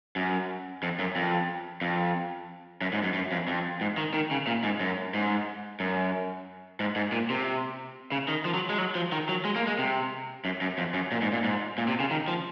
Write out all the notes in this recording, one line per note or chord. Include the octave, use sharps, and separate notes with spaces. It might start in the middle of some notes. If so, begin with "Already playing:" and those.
F#2
F2
F#2
F2
F2
F#2
G#2
F#2
F#2
F2
F2
G#2
D#3
D#3
C#3
A#2
G#2
F#2
G#2
F#2
G#2
G#2
A#2
C3
C#3
D#3
F3
F#3
G#3
F#3
F3
D#3
F#3
G#3
A#3
G#3
C3
F#2
F#2
F2
F#2
A#2
G#2
A#2
G#2
A#2
C3
C#3
D#3
F3